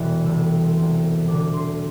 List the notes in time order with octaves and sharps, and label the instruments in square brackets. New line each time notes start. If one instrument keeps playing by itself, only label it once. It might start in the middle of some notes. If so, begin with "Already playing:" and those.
Already playing: [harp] E1 E2 C3 E3 G3
C2 C3 A3 C4 E6
C2 C3 A3 C4
E1 E2 D3 D6
C6